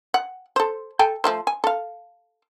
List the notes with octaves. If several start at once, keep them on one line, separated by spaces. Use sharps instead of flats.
F#5
A4 C5
A4 G5 G#5
F3 A3 C5
G#5
A4 F5